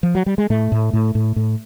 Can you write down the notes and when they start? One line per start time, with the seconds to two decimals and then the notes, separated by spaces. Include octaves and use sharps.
0.03 F3
0.15 F#3
0.26 G3
0.38 G#3
0.50 A2 A3
0.72 A2
0.93 A2
1.15 A2
1.36 A2